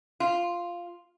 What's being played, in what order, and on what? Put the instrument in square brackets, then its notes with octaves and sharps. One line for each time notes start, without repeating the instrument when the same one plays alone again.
[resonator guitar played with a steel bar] F4